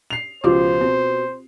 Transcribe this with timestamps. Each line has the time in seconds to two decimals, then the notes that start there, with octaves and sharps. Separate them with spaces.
0.10 C7 F7
0.44 C#2 B2 F3 F4 G4 C5 D6
0.81 B2 C4